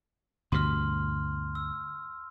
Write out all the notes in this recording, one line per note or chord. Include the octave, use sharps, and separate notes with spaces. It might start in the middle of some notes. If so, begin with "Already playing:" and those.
D2 G2 B2 C6 F6
E6